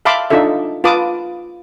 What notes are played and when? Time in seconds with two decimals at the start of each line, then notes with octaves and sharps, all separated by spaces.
0.05 E5 F5 A5 B5 C6 D6
0.30 D4 D#4 F4 A4 E5
0.84 F4 B4 A5 D6 D#6